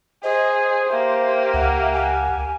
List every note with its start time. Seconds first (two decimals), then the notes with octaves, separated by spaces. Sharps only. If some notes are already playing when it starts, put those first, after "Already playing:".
0.23 G#4 C5 D#5
0.90 A#3 G4 E5
1.54 C#2 E5 F#5
1.92 F#5 G#5